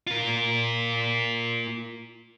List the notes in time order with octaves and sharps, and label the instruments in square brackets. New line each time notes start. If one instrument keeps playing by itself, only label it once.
[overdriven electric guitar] F4 A#4